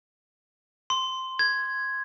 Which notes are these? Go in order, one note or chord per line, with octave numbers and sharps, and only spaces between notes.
C6
G#6